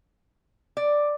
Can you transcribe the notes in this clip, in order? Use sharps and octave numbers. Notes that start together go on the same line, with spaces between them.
D5